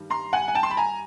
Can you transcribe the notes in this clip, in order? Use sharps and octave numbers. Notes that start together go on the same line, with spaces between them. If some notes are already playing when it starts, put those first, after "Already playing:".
Already playing: G2 D#3 G3
A#5 C6
F#5 G#5
G#5
G5 A5
C6
B5
G#5 A#5